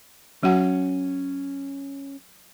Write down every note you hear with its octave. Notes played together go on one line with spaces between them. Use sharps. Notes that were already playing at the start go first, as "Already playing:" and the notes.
F#3 C#4 F#4 F#5